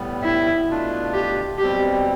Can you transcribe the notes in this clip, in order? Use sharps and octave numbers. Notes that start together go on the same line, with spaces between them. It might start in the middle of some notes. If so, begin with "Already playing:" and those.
Already playing: A2 G3 B3
E4
B2 A3 D4 F4
G4
B2 G3 C4 G4